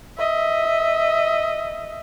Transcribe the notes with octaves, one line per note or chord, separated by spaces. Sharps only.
D#5 E5